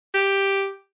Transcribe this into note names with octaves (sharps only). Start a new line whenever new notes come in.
G4